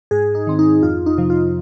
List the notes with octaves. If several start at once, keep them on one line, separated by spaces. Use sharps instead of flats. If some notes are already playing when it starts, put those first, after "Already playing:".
G#2 G#4
D#4
D#3 C4
D#4
F2 F4
D#4
C3 F3
F4